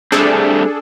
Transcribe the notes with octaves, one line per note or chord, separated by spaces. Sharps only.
G3 A3 C4 D4 G#4 A4